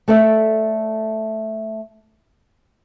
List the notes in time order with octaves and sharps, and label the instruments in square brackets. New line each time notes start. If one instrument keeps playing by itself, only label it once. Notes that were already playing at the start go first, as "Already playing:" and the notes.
[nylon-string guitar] A3 A4 D5 E5